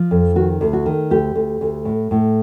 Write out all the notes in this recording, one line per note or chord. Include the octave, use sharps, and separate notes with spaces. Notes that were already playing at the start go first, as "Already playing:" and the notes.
Already playing: F3
F2
D#3 F#4
D2
F#4
D#3
D2 G4
D2
D2
A2
A2